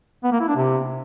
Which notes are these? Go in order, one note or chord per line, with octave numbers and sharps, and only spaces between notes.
B3
A#3
E4
D4
C3